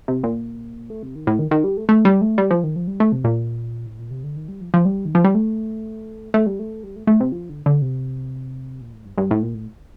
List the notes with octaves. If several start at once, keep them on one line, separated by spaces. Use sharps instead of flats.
C3
A#2
A3
C3
D#3
A2
D#3
D#3
G3
A3
A3
G3
A3
G3
F3
D#3
F3
G3
A3
C3
A#2
A2
A#2
C3
D3
D#3
G3
F3
F3
G3
D#3
F3
G3
A3
A3
G3
A3
G3
A3
A3
C3
F3
D3
D3
C3
A#2
A2
G2
G2
A2
A#2
A2